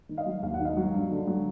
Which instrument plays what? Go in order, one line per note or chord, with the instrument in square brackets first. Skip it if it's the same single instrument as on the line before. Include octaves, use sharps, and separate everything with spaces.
[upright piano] D#3
D#5 F5
F#3
D#2 F5
F#5
D#3
D#5 F5
F#3
G2
D3
F#3